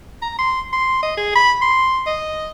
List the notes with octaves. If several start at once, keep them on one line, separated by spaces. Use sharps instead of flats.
A#5
C6
C6
D#5
G#4
B5
C6
D#5